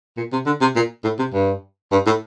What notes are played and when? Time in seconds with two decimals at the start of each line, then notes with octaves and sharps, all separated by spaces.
0.17 A#2
0.32 C3
0.46 D3
0.61 C3
0.76 A#2
1.04 A2
1.19 C3
1.33 G2
1.92 G2
2.06 A2